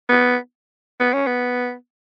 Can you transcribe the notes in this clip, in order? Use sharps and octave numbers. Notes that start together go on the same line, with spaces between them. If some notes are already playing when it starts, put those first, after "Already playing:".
B3
B3
C#4
B3